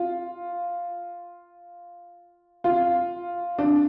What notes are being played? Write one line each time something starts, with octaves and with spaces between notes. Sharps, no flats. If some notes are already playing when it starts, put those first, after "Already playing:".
Already playing: F4
F4
D4